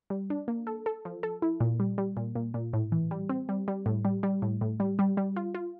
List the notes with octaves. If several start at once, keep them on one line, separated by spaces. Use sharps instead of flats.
G3
D4
A#3
A4
A4
F3
A4
E4
A#2
G3
G3
A#2
A#2
A#2
A2
E3
G3
C4
G3
G3
A2
G3
G3
A2
A2
G3
G3
G3
F4
F4